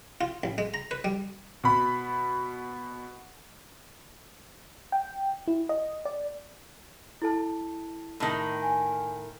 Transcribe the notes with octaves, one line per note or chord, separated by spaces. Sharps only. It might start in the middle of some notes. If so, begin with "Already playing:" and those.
F4
A1
G#3
A#5
B4
G3
B2 B5
G5
E4
D#5
D5
E4 A4 A5
A2 D#3
G#5